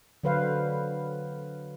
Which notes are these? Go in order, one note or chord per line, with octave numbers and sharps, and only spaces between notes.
D3 F#3 B4 C5 F5